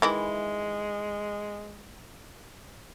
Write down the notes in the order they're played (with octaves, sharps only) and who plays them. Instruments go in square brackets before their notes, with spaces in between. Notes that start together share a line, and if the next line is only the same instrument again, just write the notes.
[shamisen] D#3 E3 E4 [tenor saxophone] G#3